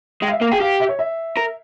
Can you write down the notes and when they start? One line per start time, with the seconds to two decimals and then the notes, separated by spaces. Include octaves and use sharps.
0.22 G#3 G5
0.28 F5
0.32 E5
0.41 A#3 F5
0.52 G#4 G5
0.61 G4 F5
0.80 E5
0.89 C#5
0.99 E5
1.37 A#4